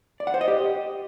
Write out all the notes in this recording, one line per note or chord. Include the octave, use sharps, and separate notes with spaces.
D5
F#5
C5
D#5
G4